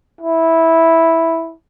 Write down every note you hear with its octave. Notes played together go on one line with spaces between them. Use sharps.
E4